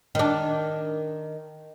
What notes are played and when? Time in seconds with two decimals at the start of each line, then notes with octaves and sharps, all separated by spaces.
0.15 D#3 D4